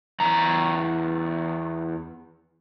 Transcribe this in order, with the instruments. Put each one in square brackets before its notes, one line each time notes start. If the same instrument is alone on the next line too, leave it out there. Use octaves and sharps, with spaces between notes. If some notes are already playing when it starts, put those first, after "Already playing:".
[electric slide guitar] E2 A#5